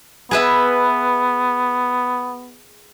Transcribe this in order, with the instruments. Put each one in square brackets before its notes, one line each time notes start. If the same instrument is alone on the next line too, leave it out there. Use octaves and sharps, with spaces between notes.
[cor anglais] B3 [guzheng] G#4 B4 E5